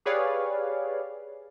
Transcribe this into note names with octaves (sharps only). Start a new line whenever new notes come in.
G4 G#4 B4 C#5 D5 F5